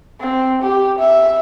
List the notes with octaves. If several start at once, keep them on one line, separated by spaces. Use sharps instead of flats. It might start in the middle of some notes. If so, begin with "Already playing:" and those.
C4
G4
E5